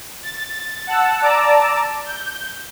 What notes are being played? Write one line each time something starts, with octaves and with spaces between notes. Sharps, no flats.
A6
F#5 A5 E6
D5 A5 A#5 D6 E6
G6